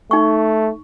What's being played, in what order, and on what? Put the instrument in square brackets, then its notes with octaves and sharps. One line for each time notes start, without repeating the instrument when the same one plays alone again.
[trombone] A3 [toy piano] D#4 C#6